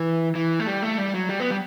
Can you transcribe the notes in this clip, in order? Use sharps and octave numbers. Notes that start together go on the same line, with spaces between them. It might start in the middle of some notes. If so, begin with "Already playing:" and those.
Already playing: E3
E3
A3
G3
A3
G3
F#3
G3
B3
G3